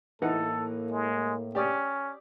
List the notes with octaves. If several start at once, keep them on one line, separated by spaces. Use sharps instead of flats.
A2 E3 A#3 D#4 A4 F#5
G#3
C#4 G4 D5 D#6